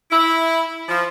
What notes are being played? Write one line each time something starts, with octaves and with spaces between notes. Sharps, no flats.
E4
F3